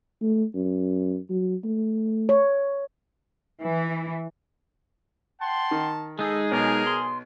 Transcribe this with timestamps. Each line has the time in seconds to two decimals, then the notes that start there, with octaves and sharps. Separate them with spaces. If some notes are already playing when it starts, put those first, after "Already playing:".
0.22 A3
0.54 F#2
1.30 F#3
1.64 A3
2.29 C#5
3.62 E3
5.41 F#5 G5 A5 C6
5.71 D#3
6.19 G#3 D#4 G#4 A4
6.52 B1 A#4
6.87 C6